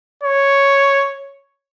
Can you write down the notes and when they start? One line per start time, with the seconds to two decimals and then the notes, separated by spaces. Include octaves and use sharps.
0.23 C#5